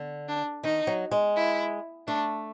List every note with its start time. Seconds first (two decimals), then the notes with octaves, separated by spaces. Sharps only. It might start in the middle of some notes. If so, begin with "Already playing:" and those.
Already playing: D3
0.28 D4
0.63 D#3 D#4
0.87 F#3
1.11 G#3
1.36 E4
2.07 A3 D4